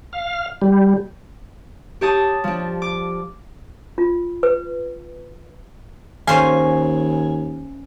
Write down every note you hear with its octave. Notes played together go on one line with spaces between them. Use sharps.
F5
G3
G4 C#5 A5 D#6
F3 D4
D6
F4
B4
D#2 C#4 C5 F5 G#5